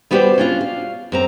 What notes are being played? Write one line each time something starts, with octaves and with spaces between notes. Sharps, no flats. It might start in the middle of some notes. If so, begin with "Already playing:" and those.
G3 B3 F#4 G4 C5 D5
C#4 D4 F4
F5
F#2 C4 A#5